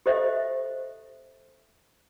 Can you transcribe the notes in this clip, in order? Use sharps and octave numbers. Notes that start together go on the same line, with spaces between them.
G4 A4 C5 D#5 E5 F#5